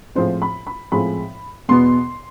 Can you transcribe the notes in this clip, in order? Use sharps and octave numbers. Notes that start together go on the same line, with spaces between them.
A2 F3 G#3 C4 C5
B5
B5
A2 F3 G#3 C4 B5
E2 B2 B3 C6